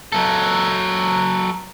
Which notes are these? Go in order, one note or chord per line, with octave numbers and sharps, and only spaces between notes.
F#3 A4